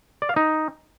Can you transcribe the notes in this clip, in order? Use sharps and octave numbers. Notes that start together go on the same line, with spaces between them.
D5
F5
D#4